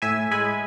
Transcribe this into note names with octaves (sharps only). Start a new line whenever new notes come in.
A2 E5 G#5
G#3 G#5 B5